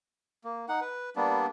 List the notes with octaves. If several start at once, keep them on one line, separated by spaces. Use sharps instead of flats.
A#3
D#4 F#5
B4
G3 A#3 B3 D4